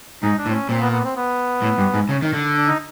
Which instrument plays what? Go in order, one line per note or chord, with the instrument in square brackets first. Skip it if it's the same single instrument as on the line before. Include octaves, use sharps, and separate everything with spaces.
[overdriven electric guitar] G#2 [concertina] D#4
[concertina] D4
[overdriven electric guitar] A2
[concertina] C4
C#4
[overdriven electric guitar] A#2 [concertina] C4
[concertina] B3
B3
C4
B3
[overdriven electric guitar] A2
G2
G#2
C#3
D#3
D3
[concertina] D4
D#4